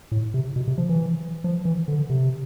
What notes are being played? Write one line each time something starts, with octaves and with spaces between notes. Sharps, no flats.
A2
C3
B2
C3
F3
E3
F3
E3
D3
C3